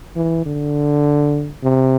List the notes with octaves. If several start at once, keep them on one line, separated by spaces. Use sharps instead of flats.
E3
D3
C3